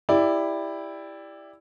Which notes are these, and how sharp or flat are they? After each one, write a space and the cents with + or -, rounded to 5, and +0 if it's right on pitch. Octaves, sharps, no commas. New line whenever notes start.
E4 +0 G4 +20 D5 +0